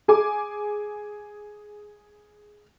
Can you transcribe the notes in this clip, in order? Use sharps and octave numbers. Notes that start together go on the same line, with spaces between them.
G#4 G#5 D6